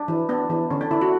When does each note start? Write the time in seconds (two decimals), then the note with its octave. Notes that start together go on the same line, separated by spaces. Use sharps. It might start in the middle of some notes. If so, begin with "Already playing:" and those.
Already playing: D4
0.08 E3
0.29 B3 D4
0.50 E3
0.71 D3 C#4
0.81 D4
0.91 D3 E4
1.01 F#4